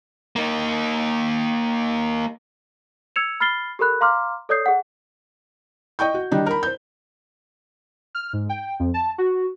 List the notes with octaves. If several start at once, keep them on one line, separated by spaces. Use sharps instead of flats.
A#3 D#4
E6 G#6 C#7 E7 F7
B5 F6 A6 C7 G7
G4 A4 A#4 B5 F#6
F5 A#5 C6 D6 F6
A4 C#5 D5 D#6 G6 C7
G#4 F#5
D#5 G5 C#6 G6
F#4
D#3 G3 D4 D#4
A#4 B5
C5 G6
F6
G#2
G5
F2
A5
F#4